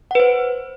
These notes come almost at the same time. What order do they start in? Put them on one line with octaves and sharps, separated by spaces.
F#5 B4 C5